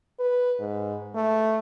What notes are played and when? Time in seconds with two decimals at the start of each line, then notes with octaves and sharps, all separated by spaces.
0.20 B4
0.60 G#2
1.15 A3